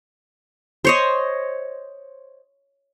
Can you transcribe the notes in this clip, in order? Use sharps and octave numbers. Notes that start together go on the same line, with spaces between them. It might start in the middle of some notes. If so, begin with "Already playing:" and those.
C5 C#5 D#5